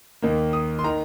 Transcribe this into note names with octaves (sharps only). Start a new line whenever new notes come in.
D#2 D#3 A#3
D#6
C6
D#3 A#5